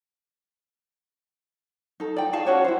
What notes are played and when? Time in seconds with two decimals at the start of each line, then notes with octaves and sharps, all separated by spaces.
2.00 D#4 A4
2.16 D5 G5
2.33 D#4 G#4 F5 A5
2.46 C#4 F#4 C#5 D5
2.64 E4 C5